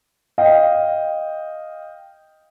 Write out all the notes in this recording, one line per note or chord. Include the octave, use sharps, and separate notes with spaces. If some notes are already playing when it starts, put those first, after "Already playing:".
D#5 F5 G5